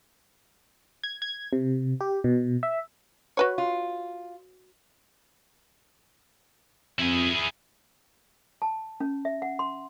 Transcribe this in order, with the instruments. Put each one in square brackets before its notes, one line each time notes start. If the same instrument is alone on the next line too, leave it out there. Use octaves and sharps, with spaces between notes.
[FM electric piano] G#6
G#6
C3
G4
B2
E5
[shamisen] F#4 B4 C#5
[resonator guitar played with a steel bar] F4
[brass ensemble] F2 [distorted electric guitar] E4 G#4
[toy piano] A5
C#4
E5
F#5
C6